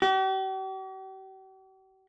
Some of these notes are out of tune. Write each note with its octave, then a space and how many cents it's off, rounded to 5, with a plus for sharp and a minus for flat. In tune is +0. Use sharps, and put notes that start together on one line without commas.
G4 -45